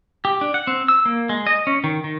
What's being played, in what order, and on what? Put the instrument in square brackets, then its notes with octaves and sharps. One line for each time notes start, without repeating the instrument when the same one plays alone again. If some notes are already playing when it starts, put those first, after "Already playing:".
[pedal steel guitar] G4
D4
F#5
C4
E6
A#3
G#3
D#5
C#4
D#3
D#3